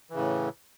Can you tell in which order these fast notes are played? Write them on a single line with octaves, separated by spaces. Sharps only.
E3 C#3 A2